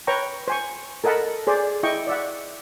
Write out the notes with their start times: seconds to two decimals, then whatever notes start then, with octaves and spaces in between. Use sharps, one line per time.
0.07 B4 C#5 G5 A#5 C#6
0.48 C5 G#5 C#6
1.04 A4 A#4 D#5 F#5 A5 B5
1.47 G#4 C5 D5
1.83 E4 D#5 G5 C#6
2.07 D5 E5 F#5